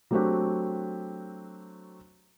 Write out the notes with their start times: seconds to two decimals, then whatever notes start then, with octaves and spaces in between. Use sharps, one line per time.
0.11 F#3 A3 C4 D4 F#4 G4